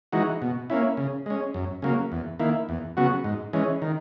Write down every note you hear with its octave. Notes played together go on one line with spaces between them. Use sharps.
E3 G#3 D#4 F#4
B2
A#3 C#4 E4
C#3
G#3 C#4
F#2
C#3 F#3 A#3
E2
D#3 A#3 E4
E2
C#3 F#3 B3 F#4
G#2
E3 G#3 C#4
D#3